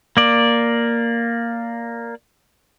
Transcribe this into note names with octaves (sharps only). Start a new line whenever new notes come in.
A#3 D5